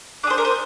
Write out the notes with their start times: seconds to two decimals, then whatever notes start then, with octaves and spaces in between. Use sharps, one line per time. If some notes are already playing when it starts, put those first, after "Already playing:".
0.23 D4 D5
0.27 G#4 C5
0.38 A#4
0.45 C5